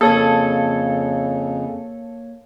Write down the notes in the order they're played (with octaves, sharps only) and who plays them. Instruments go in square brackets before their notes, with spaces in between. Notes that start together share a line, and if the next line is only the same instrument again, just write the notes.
[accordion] F2 C#3 [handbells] A#3 C#5 G#6 [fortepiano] A4